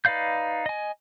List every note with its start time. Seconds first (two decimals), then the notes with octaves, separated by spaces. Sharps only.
0.05 D#4 B4 D5 F5 G6
0.66 D#5 G#5